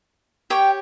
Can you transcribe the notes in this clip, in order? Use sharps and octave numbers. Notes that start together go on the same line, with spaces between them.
G4 C#5 G5